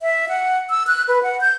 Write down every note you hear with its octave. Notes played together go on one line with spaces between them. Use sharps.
E5
F#5
E6
F#6
B4
F#5
G6